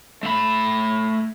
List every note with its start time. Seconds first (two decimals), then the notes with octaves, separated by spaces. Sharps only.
0.23 A3 B5